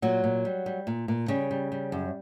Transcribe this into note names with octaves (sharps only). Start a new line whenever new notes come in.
A#2 F#3 F#4
A#2
G3
G3
A#2
A#2
C#3 G3 C#4
G3
G3
F#2